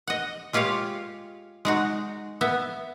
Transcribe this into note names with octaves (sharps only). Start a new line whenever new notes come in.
D#5 F#5
G#3 F4 G4 C#5 F5
G#3 D#4 F#4
B3 E5